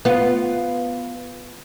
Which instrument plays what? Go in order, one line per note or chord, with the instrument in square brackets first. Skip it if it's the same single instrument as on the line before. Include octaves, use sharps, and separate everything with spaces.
[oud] B3 F4